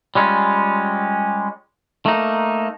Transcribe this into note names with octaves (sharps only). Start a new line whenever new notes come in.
G3 G#3 C#4 F4
A3 A#3 D#4